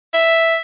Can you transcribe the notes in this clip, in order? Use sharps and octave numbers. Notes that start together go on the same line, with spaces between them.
E5